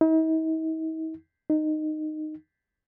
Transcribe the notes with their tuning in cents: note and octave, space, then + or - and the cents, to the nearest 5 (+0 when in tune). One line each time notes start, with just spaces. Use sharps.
D#4 +45
D#4 -15